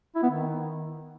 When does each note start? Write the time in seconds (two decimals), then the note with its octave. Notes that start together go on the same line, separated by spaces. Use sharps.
0.15 E4
0.23 B3
0.30 D#3